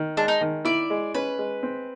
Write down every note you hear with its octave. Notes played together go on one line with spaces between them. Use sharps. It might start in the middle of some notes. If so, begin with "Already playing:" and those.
Already playing: D#3
G#3 D4
D#4
D#3
E4 D5
G#3
C#4 B4
G#3
C4